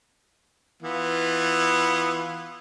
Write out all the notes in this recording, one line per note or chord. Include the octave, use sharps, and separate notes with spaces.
E3 B3 F4